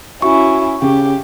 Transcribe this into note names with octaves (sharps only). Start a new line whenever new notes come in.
C#4 E4 F#4 C#6
C#3 G4